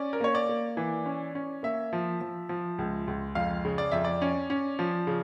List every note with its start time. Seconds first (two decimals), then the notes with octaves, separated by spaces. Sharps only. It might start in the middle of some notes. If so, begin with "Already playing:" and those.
Already playing: C#4 D5
0.13 A#4
0.20 A#3 C#5
0.35 D5
0.49 A#3
0.77 E3
1.06 C#4
1.35 C#4
1.63 A#3 E5
1.93 F3
2.21 F3
2.49 F3
2.78 C#2
3.07 C#2
3.35 F2 F5
3.65 C#3
3.78 D5
3.91 F2 E5
4.05 D5
4.22 C#4
4.50 C#4
4.79 F3
5.07 C#3